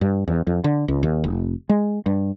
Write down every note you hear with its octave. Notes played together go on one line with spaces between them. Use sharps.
G2
E2
F2
D3
C#2
D#2
F1
G#3
G2